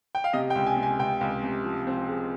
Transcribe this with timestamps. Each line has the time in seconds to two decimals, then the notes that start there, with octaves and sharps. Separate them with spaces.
0.15 G5
0.24 F5
0.33 C3 D#5
0.50 G5
0.55 C#2
0.67 G#5
0.77 C3
0.83 G#5
0.99 C#2 G5
1.21 C#2
1.43 C3
1.65 F3
1.87 C4
2.09 G#3